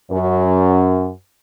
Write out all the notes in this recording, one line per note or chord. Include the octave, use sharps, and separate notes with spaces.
F#2